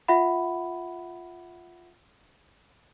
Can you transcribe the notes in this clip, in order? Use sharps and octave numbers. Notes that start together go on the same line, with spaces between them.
F4 E5 F#5 B5